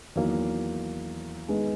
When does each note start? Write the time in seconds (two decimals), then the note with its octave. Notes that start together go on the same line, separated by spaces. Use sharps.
0.15 E2 D#3 F#3 A#3
1.48 D#3 G#3 B3 D#4 G#4